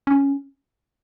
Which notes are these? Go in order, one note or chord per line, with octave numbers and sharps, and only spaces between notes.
C#4